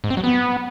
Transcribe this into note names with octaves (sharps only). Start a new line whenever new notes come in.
G#2
C4
F#3
B3